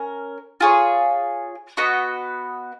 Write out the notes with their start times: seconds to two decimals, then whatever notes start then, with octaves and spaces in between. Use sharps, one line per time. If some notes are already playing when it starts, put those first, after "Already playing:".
Already playing: C#4 A#4
0.60 F4 G#4 C#5
1.77 B3 F#4 B4 D#5